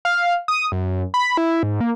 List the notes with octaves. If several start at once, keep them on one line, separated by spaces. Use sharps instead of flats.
F5
D#6
F#2
B5
E4
G#2
A#3